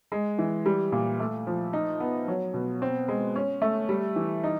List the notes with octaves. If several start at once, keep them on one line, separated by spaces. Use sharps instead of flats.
G#3
E3
G3
A#2
A3
F3
D#4
B3
F#3
B2
C4
G#3
C#4
A3
G3
E3
D#4